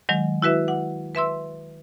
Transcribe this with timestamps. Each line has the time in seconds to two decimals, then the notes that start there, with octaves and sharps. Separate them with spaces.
0.09 D#3 F#3 G#3
0.42 E4 F#4 B4 E5
0.68 F#5
1.15 B4 E5 C6 E6